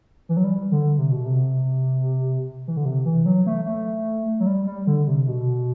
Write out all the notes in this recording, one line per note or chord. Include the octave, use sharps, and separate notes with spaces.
E3
F#3
G3
D3
C3
B2
C3
E3
D3
C3
E3
F#3
A3
A3
F#3
G3
G3
D3
C3
B2